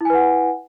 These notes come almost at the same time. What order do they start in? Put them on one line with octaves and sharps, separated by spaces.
E4 G#5 B4 F#5